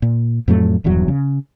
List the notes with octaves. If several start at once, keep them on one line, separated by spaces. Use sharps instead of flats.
A#2
F2 A2 F#3 A3
D#1 E2 G2 F#3
C#3